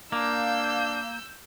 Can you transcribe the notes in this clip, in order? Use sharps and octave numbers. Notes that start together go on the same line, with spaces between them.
A#3 D4 F5 E6 G6